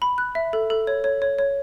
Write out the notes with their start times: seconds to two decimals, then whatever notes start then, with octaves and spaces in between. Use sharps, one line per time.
0.02 B5
0.18 F#6
0.35 E5
0.53 A4
0.70 A4
0.87 C#5
1.04 C#5
1.22 C#5
1.38 C#5